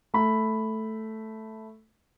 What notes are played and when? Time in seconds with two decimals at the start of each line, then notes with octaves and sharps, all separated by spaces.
0.14 A3 B5